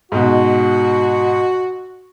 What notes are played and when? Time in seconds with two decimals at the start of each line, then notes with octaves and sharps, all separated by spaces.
0.12 G#2 B2 F#4